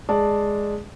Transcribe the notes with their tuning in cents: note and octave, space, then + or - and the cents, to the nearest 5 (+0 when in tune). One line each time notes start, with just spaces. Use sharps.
G#3 +0 D5 +0 A5 +0